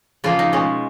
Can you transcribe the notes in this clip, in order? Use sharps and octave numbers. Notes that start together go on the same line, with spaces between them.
C#3 F3 A#3 F4
D#4
B2 G#3 C#4